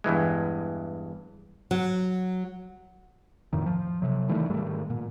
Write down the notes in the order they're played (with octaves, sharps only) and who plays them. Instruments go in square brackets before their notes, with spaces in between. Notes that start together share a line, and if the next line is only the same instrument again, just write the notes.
[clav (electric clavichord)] E2 G2 E3 G#3
[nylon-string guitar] F#3
[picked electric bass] F2 A2 D#3
F3
C3 F#3
D#3 E3 G3 A3
G#2 D#3 G3 A3
A#2